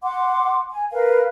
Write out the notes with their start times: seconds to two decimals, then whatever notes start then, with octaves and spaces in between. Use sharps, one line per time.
0.03 F#5 C6 D6
0.70 G#5
0.91 A#4 B4 F5